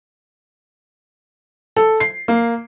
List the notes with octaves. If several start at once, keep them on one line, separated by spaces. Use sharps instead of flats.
A4
C7
A#3